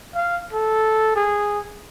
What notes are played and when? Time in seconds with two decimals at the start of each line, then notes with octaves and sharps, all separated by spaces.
0.15 F5
0.53 A4
1.16 G#4